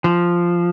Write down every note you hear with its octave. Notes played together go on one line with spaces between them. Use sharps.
F3